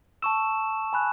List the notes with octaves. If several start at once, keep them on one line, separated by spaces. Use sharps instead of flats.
A5 C#6 E6 E7
G#5 B5 F#6